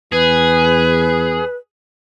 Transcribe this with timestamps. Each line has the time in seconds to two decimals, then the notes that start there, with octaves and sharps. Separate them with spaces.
0.12 E2 G#4 B4